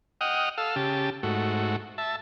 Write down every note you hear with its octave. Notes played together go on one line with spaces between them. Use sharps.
D#5 F#5 G5 D#6 F6
A4 F5 E6
C#3 G4 A5
G#2 A3 F#4
E5 A5